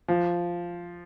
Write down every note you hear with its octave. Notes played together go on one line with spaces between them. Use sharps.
F3